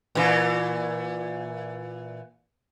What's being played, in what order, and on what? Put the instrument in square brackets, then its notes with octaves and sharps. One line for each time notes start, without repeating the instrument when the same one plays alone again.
[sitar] A#2 E3